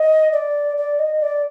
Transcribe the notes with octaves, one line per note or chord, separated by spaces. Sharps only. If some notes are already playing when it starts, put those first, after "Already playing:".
Already playing: D#5
D5
D5
D#5
D5